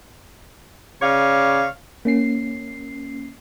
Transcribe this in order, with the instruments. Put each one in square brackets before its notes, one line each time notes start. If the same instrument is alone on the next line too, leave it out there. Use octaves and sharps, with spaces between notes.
[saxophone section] C#3 C#5 D5 F5
[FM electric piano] A#3 C#4 C7